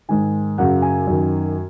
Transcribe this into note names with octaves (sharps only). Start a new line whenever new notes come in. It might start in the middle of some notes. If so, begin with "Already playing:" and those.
G#2 D#3 G#5
F#2 C#3 F#5
G#5
F#2 D#3